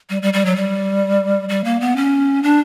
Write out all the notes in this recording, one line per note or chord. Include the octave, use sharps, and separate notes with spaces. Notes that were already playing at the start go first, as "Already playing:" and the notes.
G3
G3
G3
F#3
G3
G3
A#3
B3
C#4
D4